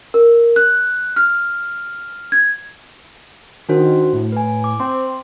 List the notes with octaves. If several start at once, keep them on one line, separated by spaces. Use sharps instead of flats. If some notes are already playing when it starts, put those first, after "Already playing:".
A#4
F#6
F6
G#6
D#3 D4 F#4 C5
A2
B4 G#5
D6
C4 C6